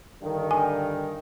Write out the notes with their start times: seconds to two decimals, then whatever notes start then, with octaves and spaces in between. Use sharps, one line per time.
0.22 G2 D3 D#3
0.51 G#5